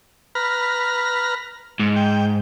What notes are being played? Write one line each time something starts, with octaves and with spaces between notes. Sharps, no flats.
B4 A#5 F6
G#2
G5